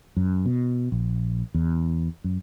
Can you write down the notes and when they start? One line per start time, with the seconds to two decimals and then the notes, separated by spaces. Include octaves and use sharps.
0.17 F#2
0.46 B2
0.92 A#1
1.54 E2
2.24 F#2